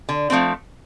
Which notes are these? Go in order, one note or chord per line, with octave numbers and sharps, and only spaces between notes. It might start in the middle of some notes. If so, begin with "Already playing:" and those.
D3
F3 A3 C4